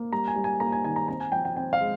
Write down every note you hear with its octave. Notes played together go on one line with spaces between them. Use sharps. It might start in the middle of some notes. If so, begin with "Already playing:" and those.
Already playing: A#3
G3 A#5
G#5
G3
G#5
A#3 A#5
G#5
D#3 G#5
A#5
C4 A#5
G#5
F3 G5
G5
C4 G5
F5
G#3